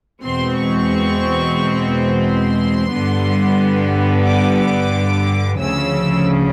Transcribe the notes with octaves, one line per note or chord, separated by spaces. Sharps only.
E2 B2 G#3 C4 C6
C#6
C6
G2 D3 G3 B3
D6
D6
D2 C#3 F3 E6